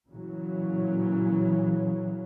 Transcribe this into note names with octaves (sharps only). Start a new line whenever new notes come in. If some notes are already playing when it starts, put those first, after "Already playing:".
A#2 C#3 E3 F#3